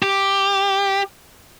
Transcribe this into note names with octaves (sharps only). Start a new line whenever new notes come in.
G4